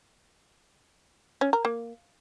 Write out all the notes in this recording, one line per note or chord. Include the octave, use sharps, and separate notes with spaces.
C#4
A#4
A#3